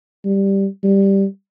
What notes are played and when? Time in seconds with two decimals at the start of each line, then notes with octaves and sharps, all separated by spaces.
0.25 G3
0.84 G3